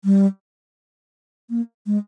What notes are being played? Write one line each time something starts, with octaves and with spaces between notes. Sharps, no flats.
G3
A#3
G#3